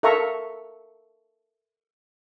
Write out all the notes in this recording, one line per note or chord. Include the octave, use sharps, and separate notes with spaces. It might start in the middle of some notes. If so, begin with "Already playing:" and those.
A4 A#4 E5 F5 A#5 C#6